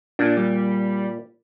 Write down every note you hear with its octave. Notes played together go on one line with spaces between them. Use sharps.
A#2 D4
G3